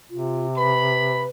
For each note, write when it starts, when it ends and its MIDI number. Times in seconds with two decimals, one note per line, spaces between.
0.11 1.27 48
0.11 0.47 65
0.57 1.29 71
0.57 1.26 83